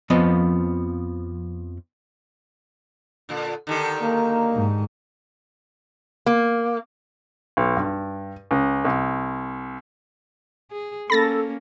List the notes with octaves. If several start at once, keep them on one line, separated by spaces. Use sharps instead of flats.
F2 F3 B3 D#5
A#2 D3
D3 D#3 G4
A#3
G#2
A#3
B1
G2
C#2
C2
G#4
A#3 C#4 A4 B5 A6 A#6